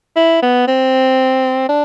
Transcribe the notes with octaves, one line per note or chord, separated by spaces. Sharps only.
E4
B3
C4
D4